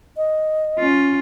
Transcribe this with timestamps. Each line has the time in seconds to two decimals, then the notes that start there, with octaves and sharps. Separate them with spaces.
0.17 D#5
0.78 C#4 F4